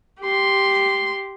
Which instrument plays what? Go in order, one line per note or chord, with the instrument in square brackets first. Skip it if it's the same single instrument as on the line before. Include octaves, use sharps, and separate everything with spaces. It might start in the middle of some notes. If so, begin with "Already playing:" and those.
[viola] G4 C6